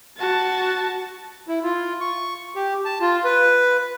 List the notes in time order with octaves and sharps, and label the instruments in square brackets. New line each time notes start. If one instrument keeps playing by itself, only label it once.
[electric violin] F#4 A5
[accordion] E4
F4
C#6
G4
A5
F4
B4